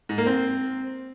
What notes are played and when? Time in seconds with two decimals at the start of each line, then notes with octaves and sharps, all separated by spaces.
0.09 G#2
0.18 A#3
0.27 C4